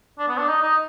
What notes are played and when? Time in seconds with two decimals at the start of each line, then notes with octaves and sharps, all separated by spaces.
0.19 D4
0.28 B3
0.38 D4
0.48 D#4
0.62 D#4